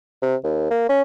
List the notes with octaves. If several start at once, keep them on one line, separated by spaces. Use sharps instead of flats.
C3
D#2
A#3
C#4